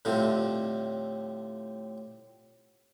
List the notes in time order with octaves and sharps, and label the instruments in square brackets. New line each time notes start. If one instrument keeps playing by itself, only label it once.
[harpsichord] A2 D3 F3 G3 C4